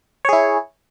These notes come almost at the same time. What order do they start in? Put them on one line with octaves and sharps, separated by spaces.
C#5 G#4 E4